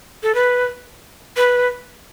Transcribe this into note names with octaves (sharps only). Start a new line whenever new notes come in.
A4
B4
B4